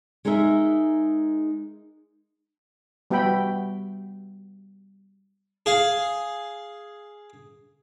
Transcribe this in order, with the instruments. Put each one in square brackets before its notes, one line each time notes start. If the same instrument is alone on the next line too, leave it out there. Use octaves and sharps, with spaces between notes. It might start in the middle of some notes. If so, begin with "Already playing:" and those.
[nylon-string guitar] G#3 D#4 G#4 A#4 E5
[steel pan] G3 B3 F#4 E5 G5 B5
[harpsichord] G#4 F5